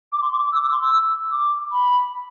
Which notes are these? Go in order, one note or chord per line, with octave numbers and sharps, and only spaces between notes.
D6
C6
D6
D6
E6
D6
C6
E6
D6
B5